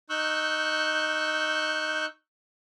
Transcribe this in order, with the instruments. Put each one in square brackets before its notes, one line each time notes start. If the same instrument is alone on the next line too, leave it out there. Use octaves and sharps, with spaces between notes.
[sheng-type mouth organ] D#4 C#6 E6 F#6 G6